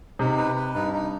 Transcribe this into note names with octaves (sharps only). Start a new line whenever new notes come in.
C3 D#4
B4
B4
G2 D#4
D#4